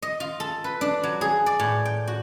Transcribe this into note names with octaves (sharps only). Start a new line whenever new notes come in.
D#5
F4
A4
B4
D4
F#3
G#4
D5
A2
G5
F#4